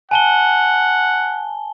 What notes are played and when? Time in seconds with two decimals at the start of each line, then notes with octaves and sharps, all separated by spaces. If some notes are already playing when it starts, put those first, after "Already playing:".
0.11 F#5 G#5 A5 G7